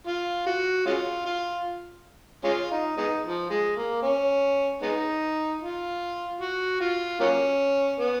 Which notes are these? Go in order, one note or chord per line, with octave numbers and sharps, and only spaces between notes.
F4
F#4
G#3 C#4 F4
F4
G#3 C#4 F4
D#4
G#3 B3 D#4
F3
G#3
A#3
C#4
G#3 B3 D#4
F4
F#4
F4
F#3 A#3 C#4
B3